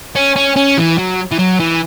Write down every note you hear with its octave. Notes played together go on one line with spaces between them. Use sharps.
C#4
C#4
C#4
E3
F#3
E3
F#3
E3